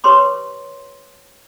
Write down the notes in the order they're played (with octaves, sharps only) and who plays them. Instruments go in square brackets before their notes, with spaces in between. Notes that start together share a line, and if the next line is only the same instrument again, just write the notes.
[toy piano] G4 B4 C#5 C6 D6